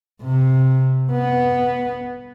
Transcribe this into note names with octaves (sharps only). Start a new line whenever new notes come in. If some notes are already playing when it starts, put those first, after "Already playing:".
C3
B3